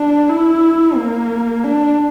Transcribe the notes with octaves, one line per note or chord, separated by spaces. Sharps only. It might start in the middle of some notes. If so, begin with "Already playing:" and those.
Already playing: D4
E4
A#3
D4